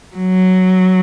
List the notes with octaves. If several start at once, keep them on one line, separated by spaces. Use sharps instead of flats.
F#3